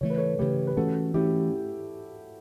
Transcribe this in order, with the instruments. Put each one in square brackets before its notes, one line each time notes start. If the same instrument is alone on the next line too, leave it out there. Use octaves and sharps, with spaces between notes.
[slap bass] C#3 E3 A3 [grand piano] C#5
[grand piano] B4
A4 C#5
[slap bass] C#3 E3 A3 [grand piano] G4 B4
[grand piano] B4
[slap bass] E3 A3 C#4 [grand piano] F#4 A4
[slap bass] E3 A3 C#4 [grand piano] E4 G4